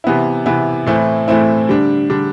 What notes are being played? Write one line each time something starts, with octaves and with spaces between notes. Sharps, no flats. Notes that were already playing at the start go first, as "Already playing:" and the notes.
C3 E3 B3 E4
C3 E3 B3 E4
A2 E3 A3 C4 E4
A2 E3 A3 C4 E4
D3 G3 D4
D3 G3 D4